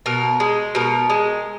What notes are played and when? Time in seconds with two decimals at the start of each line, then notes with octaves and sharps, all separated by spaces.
0.06 B2 A#4
0.40 G#3
0.75 B2 A#4
1.10 G#3